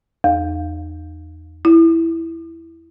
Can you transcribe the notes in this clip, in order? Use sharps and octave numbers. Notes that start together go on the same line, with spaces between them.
E2
E4